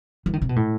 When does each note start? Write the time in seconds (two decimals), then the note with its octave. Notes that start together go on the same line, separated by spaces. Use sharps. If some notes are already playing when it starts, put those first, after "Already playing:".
0.26 E3
0.33 D#3
0.42 C3
0.49 B2
0.56 A2